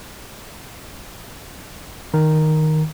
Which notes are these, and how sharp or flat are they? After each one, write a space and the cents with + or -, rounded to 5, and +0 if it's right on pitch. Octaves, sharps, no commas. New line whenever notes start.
D#3 +0 A#5 +0